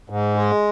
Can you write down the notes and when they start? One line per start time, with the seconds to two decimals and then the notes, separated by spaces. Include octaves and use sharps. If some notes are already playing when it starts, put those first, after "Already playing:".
0.10 G#2
0.36 G#3